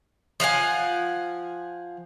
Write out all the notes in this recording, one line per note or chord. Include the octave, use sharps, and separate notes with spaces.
F3 F5 F#5 G#5